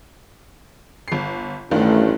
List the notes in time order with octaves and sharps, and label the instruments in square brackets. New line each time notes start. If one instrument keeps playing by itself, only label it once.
[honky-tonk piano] G1 C7
[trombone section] A1 [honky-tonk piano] G2 D#3 F4 [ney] A3